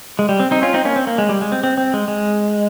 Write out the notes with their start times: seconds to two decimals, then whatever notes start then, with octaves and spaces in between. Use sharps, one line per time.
0.19 G#3
0.29 G3
0.40 C4
0.51 C4 D#4
0.62 C#4 F4
0.74 C4 D#4
0.85 A#3 C#4
0.96 C4
1.07 A#3
1.18 G#3
1.29 G3
1.41 G#3
1.52 C4
1.64 C4
1.78 C4
1.94 G#3
2.08 G#3